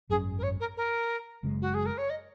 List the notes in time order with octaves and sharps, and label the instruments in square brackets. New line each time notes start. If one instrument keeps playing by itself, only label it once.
[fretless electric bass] G#1 F#2 F#3 C#4 [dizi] G#4
[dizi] A#4
C#5
A#4
A#4
[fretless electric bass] F#1 F#2 C#3 G#3
[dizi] F#4
G#4
A#4
C#5
D#5